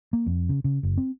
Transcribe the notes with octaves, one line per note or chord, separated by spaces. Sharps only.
A#3
F2
C#3
C#3
F#1
C4